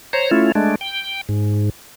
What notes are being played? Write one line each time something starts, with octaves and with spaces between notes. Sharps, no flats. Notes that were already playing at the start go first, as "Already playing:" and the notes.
C5 C#5 A#5
A3 C#4 E4 F4
G#3 A3 D4
G5
G#2